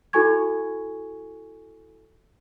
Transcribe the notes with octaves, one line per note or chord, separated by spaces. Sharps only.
E4 F#4 A4 G#5 C#6 G#6